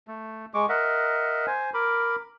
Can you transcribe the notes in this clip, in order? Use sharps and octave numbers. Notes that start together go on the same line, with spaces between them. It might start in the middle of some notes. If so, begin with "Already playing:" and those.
A3
G#3 C#6 D6
A#4 D#5 E5 F#5
C5 G#5
A#4 B5 D6